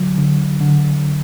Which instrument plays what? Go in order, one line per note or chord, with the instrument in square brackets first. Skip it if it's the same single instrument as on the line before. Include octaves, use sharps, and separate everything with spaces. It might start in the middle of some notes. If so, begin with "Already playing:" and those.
Already playing: [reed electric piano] D3 F#3
D3
D3